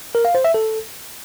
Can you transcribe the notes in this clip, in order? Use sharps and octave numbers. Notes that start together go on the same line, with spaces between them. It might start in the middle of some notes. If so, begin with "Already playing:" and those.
A#4
F5
C5
E5
A4